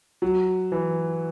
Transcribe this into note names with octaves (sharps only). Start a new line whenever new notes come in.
F#3
E3